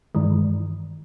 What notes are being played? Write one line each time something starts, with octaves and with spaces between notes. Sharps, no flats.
G2 D#3 E3 G#3